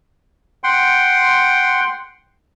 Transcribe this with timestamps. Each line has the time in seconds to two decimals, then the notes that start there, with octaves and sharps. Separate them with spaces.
0.64 F#5 G5 C6